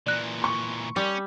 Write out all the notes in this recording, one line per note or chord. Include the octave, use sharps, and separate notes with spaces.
A#2 E3 D5 F#6 A#6
C6 C#6
G3 C#4